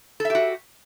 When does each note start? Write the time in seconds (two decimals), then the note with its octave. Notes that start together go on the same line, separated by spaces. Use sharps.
0.20 A4
0.25 E5
0.30 G4
0.35 F#4